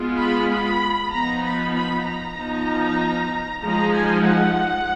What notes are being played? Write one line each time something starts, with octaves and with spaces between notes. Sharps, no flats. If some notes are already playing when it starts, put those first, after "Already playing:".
Already playing: G#3 B3 F4
B5
B5
F3 B3 D#4 A#5
B5
B5
A#5
F3 B3 D#4
F3 G#3 D#4 A#5
G#5
F#5